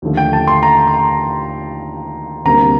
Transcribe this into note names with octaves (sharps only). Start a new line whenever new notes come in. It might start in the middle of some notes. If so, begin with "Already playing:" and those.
D#2 D3 F3 A3
G5
A5
C6
A#5
C6
A#5
D2 C3 G3 A#3 A#5